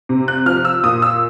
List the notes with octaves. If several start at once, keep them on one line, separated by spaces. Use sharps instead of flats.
C3
F#6
F3 F6
E6
A#2 D#6
E6